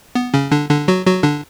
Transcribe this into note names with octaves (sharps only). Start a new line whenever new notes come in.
B3
C#3 C#4
D3 D4
D3 D4
F#3 F#4
F#3 F#4
D3 D4